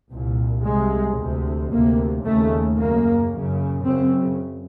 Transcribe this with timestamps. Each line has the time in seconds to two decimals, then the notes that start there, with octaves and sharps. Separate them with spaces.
0.11 C2 A#2
0.65 C2 C3 G#3
1.18 D2 C3
1.72 D2 C3 A#3
2.25 D#2 C#3 A3
2.78 F#2 C#3 A#3
3.31 F#2 C#3
3.85 F#2 C#3 C4